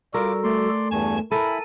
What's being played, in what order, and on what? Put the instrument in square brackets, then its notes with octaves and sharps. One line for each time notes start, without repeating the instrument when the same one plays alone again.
[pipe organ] G3 F#4 A4 [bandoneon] F4 D6 [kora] A#4
[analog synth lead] A3 [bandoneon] D5 C6
[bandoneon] E2 G2 G#5 [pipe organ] A5 C#6
[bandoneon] E4 B5 [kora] A4 A#4 [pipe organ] G#5